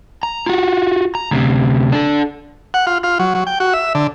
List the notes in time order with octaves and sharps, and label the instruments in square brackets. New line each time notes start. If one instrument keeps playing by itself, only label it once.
[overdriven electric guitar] A#5
F4 F#4
A#5
D2 C3
D4 A4
[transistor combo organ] F#5
F4
F4
F#3
F#3
G5
F#4
E5
D3